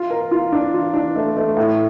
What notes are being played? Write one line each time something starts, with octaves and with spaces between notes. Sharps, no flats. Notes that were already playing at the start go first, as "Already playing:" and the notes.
Already playing: F4
A#4
F4
D4
F4
D4
A3
A3
A2